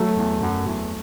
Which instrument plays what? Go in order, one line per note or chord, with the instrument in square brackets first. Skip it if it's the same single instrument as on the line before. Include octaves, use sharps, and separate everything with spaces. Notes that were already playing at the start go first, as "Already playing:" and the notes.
Already playing: [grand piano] F#3 A3
[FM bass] E2
F#2
E2